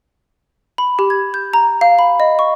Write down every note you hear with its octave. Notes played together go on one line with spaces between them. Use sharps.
B5
G4
G#6
G6
A#5
F5
B5
D#5
C#6